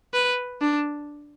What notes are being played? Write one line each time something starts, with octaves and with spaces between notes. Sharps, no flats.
B4
D4